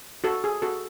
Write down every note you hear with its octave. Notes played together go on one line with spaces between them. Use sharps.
F#4 A4
G#4
F#4 A4